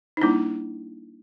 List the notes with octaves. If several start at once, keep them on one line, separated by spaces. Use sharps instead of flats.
D#4
G3 A#3 D4 E4